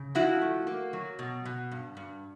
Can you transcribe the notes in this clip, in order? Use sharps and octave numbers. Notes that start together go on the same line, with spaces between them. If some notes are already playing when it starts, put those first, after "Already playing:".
Already playing: C#3
F3 E4 F#4
A3
A#3
F#3
B2
B2
G2
G2